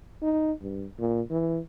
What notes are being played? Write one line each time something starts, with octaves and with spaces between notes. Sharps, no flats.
D#4
G2
A#2
E3